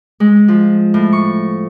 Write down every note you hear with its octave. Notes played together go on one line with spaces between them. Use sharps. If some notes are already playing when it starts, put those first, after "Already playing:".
G#3
F3
A2
C#6